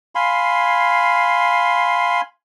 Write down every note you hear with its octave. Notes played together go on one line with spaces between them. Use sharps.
F5 G#5 B5 C6